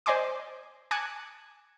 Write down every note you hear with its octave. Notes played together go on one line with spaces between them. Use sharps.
C5 D5 D#5 G#5 C6 D6
G#5 A5 D6 F#6 G#6 C#7